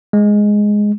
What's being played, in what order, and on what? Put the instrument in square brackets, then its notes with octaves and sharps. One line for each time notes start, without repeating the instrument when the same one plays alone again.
[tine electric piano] G#3